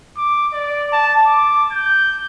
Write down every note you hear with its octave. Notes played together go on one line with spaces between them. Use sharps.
D6
D5
A5
D6
G6